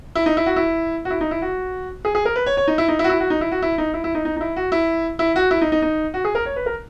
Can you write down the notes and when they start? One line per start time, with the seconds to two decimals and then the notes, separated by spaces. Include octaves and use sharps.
0.15 E4
0.26 D#4
0.37 E4
0.46 F#4
0.56 E4
1.05 F#4
1.10 E4
1.21 D#4
1.31 E4
1.42 F#4
2.05 G#4
2.15 G#4
2.25 A#4
2.36 B4
2.46 C#5
2.57 C#5
2.67 D#4
2.78 E4
2.88 D#4
2.99 E4
3.04 F#4
3.09 E4
3.20 F#4
3.30 D#4
3.41 E4
3.52 F#4
3.62 E4
3.78 D#4
3.94 E4
4.04 E4
4.15 D#4
4.25 D#4
4.37 D#4
4.41 E4
4.56 F#4
4.72 E4
5.19 E4
5.36 F#4
5.51 E4
5.61 D#4
5.72 D#4
5.82 D#4
6.14 F#4
6.25 G#4
6.35 A#4
6.46 C#5
6.56 B4
6.66 A#4